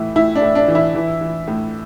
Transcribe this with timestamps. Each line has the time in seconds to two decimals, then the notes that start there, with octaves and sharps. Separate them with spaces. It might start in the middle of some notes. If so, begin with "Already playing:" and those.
Already playing: A2 E3 E4
0.15 A2 E4
0.36 D4
0.42 A2
0.55 D4
0.68 E3
0.75 E4
0.95 E3
1.21 E3
1.47 A2